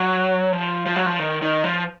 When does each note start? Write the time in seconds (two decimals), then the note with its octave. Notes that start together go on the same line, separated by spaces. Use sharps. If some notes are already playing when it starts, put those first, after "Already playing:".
Already playing: F#3
0.52 F3
0.86 F3
0.96 F#3
1.06 F3
1.19 D#3
1.42 D#3
1.64 F3